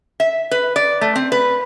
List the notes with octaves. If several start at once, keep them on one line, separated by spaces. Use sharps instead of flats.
E5
B4
D5
A3
C4
B4